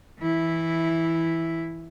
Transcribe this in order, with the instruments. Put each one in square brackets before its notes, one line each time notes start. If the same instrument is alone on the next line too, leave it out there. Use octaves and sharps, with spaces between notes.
[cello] E3 E4